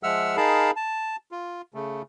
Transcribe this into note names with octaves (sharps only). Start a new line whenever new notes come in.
F3 G#3 E5 F#5 E6 F6
D#4 G#4 A#4 F5 A5 B5
A5
F4
C#3 A3